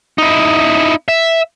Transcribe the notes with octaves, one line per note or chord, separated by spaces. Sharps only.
D#4 E4
E5